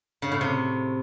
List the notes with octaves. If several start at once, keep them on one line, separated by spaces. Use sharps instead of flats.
C#3
A2
C3